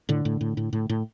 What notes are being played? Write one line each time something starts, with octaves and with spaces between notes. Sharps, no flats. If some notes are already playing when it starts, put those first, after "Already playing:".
A2 D3
A2
A2
A2
A2
A2